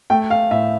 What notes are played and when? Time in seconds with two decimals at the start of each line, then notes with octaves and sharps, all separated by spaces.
0.10 A3 G5
0.30 F5
0.51 A2 E5